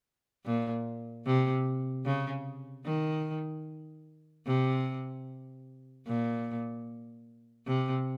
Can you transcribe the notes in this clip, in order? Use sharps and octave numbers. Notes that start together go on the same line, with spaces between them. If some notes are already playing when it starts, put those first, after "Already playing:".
A#2
C3
C#3
D#3
C3
A#2
C3